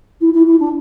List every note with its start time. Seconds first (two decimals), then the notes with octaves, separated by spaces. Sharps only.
0.21 E4
0.33 E4
0.46 E4
0.59 D4